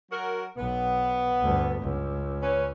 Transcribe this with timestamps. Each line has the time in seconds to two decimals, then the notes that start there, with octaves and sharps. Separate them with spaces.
0.11 F#3 F#4 A#4
0.57 B1 B3
1.41 D2 G2
1.82 C#2
2.41 C#4 B4